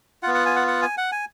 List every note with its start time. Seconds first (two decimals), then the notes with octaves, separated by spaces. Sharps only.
0.23 B3 F4 F#5
0.35 F#5
0.46 G#5
0.56 F#5
0.68 F#5
0.82 G#5
0.97 F#5
1.12 G#5